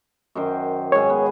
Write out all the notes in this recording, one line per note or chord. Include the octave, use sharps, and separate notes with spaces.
F#2 D#3 C5
G#2 G#4 C#5
B3